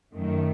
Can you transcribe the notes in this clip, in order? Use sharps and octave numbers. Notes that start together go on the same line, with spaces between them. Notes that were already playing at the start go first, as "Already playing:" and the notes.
F#2 D#3 A3